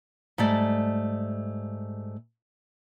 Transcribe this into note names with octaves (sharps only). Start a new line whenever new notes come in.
G#2 G3 A3 D5